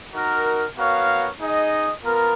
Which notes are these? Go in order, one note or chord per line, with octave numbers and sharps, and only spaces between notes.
D#4 F#4 A#4
B3 F#4 A#4 C#5 F5
D#4 G#4 D#5
B3 F4 A#4